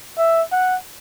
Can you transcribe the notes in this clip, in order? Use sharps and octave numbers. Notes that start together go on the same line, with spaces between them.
E5
F#5